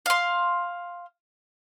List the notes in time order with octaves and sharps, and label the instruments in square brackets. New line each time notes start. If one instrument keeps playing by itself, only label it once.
[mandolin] F5 C6